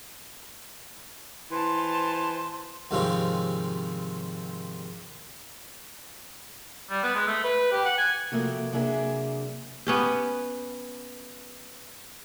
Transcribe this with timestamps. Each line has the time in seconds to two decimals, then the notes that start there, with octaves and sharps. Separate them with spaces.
1.51 E3 C5 A5 C6
2.91 D#2 G#2 C3 F3 C4 C#4
6.90 G3
7.03 B3
7.15 G#3
7.27 A3
7.44 B4
7.72 G4
7.85 F#5
7.98 G#5
8.32 C3 F3 A3 A#3 F#4
8.72 C3 F#3 A#3 D4 G#4 E5
9.87 B3 C#4 G4